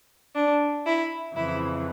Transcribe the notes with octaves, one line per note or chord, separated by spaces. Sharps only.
D4
E4
F2 C#3 E3 E4